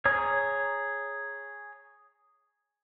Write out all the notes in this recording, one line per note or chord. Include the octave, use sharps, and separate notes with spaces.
G#4 C#5 A#5 D#6